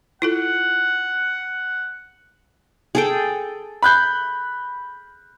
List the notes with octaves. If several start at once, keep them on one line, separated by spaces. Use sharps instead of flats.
E4 F4 A4 F#5
G#4 A4 G5
B5 F#6 G6